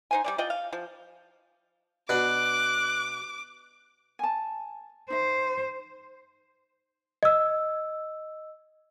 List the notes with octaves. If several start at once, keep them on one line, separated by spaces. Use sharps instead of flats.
D#4 C5 G#5
G3 C4 D5
F4 D5 D#5 G5
F5
F3
B2 D4 D6 F#6
G#5 A5
D#4 C5 E5
D#5 E6